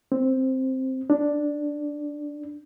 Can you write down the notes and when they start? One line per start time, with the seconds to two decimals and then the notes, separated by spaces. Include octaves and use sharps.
0.12 C4
1.10 D4